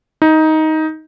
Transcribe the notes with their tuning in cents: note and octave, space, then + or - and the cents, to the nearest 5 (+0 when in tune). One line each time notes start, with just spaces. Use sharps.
D#4 +15